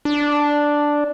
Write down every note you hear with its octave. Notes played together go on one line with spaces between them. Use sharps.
D4